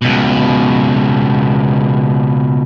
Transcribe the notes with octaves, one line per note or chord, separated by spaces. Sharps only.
C#2 B2